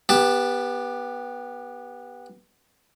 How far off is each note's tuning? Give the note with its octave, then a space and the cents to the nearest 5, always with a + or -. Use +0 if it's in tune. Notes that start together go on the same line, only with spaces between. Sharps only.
B3 -10 G4 +15 A5 +0